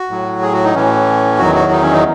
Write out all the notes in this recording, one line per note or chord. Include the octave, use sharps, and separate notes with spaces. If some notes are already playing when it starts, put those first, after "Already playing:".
Already playing: F#4
A2 F#3
G#4
F#4
D#4
A2 E3 C#4
E2 D#3 F#3 F#4
F#4
D#4
C#4
D#4